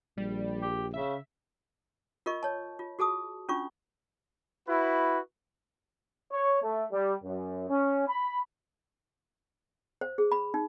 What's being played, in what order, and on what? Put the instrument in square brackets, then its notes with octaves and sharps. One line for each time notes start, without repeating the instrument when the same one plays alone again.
[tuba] A#1 [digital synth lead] G3
[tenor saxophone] G4
[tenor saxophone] C#3 [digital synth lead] E5
[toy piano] F4 A#4 D#5 C#6
C#5 A5
F4
F#4 G#4 A5 D#6
C#4 D4 F4 C#6
[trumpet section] E4 F#4 B4
[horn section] C#5
A3
G3
F#2
C#4
B5
[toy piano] C5
G#4
B5
D#4